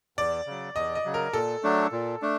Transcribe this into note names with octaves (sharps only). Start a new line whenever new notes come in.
E2 D5
C#3 F#3
E2 D#5
D#5
C#3 F#3
A#4
A#2 A4
F#3 A3 D4
A#2
A3 D4